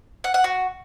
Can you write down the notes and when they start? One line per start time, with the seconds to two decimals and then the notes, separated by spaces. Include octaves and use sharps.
0.24 F#5
0.34 F#5
0.44 F#4